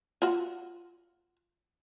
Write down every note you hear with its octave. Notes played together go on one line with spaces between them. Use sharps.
F4 F#4